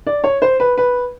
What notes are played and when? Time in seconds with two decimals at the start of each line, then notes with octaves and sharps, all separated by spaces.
0.07 D5
0.24 C#5
0.42 C5
0.60 B4
0.78 B4